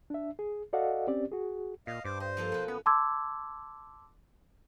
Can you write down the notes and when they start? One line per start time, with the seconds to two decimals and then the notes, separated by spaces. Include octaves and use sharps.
0.10 D4 E5
0.39 G#4
0.73 F#4 A4 D5 D#5 F5 F#5
1.07 C4 C#4 G4 D5
1.31 F#4 G#4
1.87 A#2 D#5 F5
2.05 G2 C5 D6
2.20 C5 D#5
2.37 F3 A#3 A4
2.52 B2 B4
2.68 B3 C#4
2.86 A5 C6 D6 E6 G#6